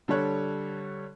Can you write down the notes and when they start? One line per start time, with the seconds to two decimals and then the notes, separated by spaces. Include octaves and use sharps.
0.08 D3 G3 A4 C#5 F#6